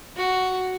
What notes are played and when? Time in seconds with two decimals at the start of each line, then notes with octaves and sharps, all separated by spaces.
0.16 F#4